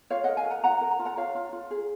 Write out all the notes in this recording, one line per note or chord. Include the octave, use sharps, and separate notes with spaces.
F4 C#5 F5
A#4 D#5 F#5
F5 G#5
A#4 F#5 A#5
F4 F#5 A#5
A#4
A#5
F4
F#5 A#5
F4 C#5 F5
F4
F4
G#4